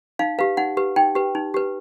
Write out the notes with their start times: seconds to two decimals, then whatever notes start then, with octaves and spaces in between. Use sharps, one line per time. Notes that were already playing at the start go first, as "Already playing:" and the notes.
0.19 D#4 F5
0.39 G4 B4 F5
0.57 D#4 F#5
0.77 G4 B4
0.96 D#4 G5
1.15 G4 B4
1.35 D#4
1.54 G4 B4